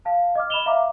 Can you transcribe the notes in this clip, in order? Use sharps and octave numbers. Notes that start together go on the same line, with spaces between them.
F5 A5
D#5 D6 F6
D#5 B5 F6 E7 F7 G7
E5 F5 A#5 D6